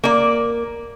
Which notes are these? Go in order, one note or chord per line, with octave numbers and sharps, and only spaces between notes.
A#3 D5